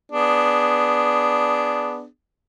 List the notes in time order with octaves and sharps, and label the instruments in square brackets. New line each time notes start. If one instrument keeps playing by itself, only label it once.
[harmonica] B3 D4 G#4